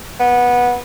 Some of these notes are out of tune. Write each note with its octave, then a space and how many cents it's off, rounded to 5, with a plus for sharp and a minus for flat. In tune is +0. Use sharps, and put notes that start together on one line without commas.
B3 -15